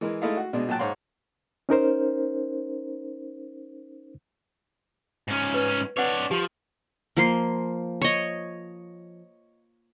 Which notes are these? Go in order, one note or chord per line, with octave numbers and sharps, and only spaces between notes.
E3 G#3 A#4
G#3 A3 D#4 E4 A4 F5
F#4
B2 G#3 D4
A#2 F#3 F#4 G5 A5 F#6
G#2 C#5 F5 F#5 C6
C#4 D#4 A#4 C5
G#2 C#4
B4
D4 B4 C#5 D5 F#5
F3 G4
F3 A#3 C6
C#5 D#5